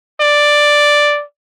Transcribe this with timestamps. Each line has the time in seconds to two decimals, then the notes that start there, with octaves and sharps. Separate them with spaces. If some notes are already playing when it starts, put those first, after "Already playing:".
0.21 D5